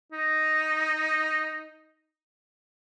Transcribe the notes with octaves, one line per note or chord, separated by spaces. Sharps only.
D#4